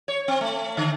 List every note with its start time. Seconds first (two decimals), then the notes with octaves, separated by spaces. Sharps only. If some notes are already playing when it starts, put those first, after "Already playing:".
0.08 C#5
0.28 C4
0.41 A3
0.77 D3